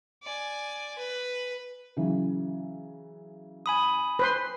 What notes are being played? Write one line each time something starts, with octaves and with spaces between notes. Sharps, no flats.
D5 G#5
B4
C#3 E3 F#3
G#5 B5 D#6
B4 C5 C6